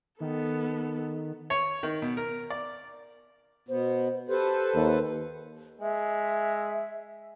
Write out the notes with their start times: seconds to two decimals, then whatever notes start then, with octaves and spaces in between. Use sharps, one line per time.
0.20 D#3 B3 A4
1.50 C#5
1.83 D#3
2.02 B2
2.17 A#4
2.50 D5
3.69 B2 B3 C5
4.29 G4 A4 B4 C5
4.75 D#2
5.81 G#3 E5